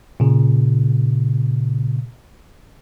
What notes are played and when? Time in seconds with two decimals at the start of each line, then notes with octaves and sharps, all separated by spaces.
0.20 A#2 C#3